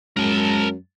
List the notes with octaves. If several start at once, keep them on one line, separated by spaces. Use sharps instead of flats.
F#2 G#3 A#4 A5